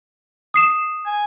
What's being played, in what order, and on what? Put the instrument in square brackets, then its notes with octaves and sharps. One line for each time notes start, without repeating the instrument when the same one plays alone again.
[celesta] D#6 C7 E7
[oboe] G#5